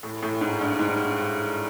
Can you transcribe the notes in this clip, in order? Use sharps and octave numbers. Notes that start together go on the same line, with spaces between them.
A2
A2
G#2
G2
G#2